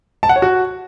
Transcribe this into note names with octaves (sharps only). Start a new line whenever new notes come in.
A5
F#5
C#5
F#4